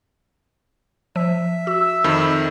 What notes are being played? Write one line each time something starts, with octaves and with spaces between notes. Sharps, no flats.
F3 E5
F#4 E6
F2 D#3 B5